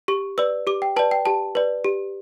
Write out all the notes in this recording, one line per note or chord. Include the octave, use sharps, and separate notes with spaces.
G4 C#6
B4 D5 E6
G4 D6
G5
B4 D5 A5
G5
G4 A5
B4 D5
G4